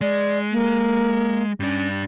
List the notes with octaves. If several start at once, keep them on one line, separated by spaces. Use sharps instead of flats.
G#3 D5
A#3
G2 C#4 D4